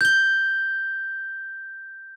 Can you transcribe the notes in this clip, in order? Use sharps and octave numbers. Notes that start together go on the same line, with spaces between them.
G6 G7